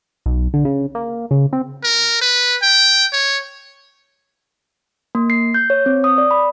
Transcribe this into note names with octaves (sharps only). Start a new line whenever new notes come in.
B1
D3
C#3
A#3
C#3
C4
A#4
B4
G5
C#5
A#3
C7
G6
C#5
C4
D#6
D5
B5